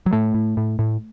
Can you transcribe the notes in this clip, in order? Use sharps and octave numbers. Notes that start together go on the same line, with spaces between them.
F#3
A2 A3
A2
A2
A2